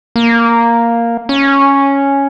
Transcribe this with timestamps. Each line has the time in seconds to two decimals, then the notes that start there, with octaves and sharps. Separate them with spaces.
0.16 A#3
1.29 C#4